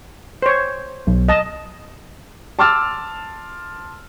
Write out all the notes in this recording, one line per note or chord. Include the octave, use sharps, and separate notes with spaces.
C5 C#5
B1
D#5 A5
A5 C6 D6 E6 F6 A6